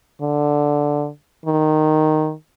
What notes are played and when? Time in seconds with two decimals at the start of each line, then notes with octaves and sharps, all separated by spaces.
0.22 D3
1.46 D#3